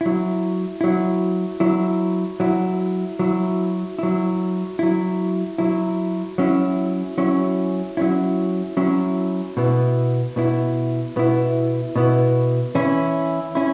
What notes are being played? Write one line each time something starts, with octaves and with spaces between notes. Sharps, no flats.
F#3 E4
F#3 E4
F#3 E4
F#3 E4
F#3 E4
F#3 E4
F#3 E4
F#3 E4
F#3 C#4 E4
F#3 C#4 E4
F#3 C#4 E4
F#3 C#4 E4
B2 B3 E4
B2 B3 E4
B2 B3 E4
B2 B3 E4
E3 C#4 E4
C#4 E4